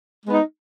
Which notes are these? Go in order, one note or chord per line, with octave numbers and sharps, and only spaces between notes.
G#3 B3 D#4